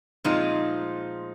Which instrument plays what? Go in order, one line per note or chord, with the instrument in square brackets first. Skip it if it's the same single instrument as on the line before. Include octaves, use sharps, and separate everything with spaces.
[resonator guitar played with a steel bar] A#2 F3 G#3 C4 F4 [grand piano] D#4